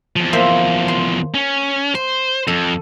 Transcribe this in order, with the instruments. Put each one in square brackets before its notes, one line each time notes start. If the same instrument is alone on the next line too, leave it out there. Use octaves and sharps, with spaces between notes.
[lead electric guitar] E2 F3
[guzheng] A#3 C5 E5
C6
[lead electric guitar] C#4
[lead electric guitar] C5 [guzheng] C6
[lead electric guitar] F2 [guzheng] A4